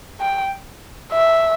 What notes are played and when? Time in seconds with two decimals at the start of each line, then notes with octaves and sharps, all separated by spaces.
0.20 G5
1.12 E5